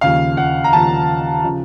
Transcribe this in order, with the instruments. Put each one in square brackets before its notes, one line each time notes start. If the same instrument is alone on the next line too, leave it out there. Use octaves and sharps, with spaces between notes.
[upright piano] D#2 C#3 F3 F5
F#5
A#5
D#2 C#3 F3 A5
C#3 F3